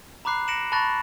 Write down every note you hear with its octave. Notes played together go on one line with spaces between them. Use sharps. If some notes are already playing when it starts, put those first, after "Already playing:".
A#5 B5 D6 F#6 C7
A#6 C#7 D7 E7 F#7
A5 B5 C#6 F#6 A6 A#6